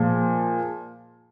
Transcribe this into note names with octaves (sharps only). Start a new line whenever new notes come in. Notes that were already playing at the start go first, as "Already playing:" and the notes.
Already playing: A#2 F3 G#3